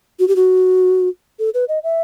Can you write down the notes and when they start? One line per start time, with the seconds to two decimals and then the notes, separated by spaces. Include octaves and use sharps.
0.19 F#4
0.28 G4
0.36 F#4
1.39 A4
1.54 B4
1.68 D#5
1.84 E5